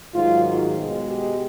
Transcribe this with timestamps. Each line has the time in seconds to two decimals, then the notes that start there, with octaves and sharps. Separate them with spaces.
0.14 G#2 D#3 F#3 F4
0.77 B2 G#3
1.08 G4